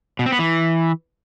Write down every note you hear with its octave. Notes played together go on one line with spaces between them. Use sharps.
B2
C4
B3
E3